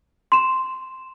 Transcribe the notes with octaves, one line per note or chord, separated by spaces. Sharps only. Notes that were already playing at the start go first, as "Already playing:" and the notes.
C6 E7